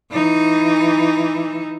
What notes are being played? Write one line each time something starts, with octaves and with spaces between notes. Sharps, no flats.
E3 D#4